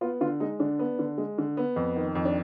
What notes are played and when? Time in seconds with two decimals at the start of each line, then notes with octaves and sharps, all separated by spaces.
0.01 B3 F4
0.21 D3 F4
0.40 G#3 D#4
0.59 D3 D4
0.79 B3
0.99 D3
1.18 G#3
1.38 D3
1.57 B3
1.76 F2
1.96 D#3
2.15 F2
2.25 D4